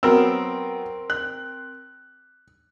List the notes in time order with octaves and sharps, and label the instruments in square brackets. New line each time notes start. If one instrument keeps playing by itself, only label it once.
[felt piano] F#3 B3 E6 [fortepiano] C4 A#4
[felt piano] F#6